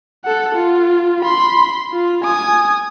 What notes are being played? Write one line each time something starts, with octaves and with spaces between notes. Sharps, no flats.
A4 F#5
F4
B5 C6
F4
G#5 D#6